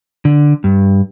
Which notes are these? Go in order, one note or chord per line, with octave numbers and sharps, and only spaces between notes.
D3
G2